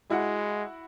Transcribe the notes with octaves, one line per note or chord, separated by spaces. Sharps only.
G#3 E4 F#4 F#5